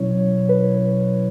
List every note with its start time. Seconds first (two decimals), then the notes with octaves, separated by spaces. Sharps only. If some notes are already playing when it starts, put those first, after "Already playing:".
Already playing: B2 F#3 C#4 E4 C#5
0.49 B4